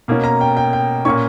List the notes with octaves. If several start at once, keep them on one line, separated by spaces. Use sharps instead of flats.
B2 A#3 C#4
A#5
G5
G5
G5
A#2 A#3 C#4 C#6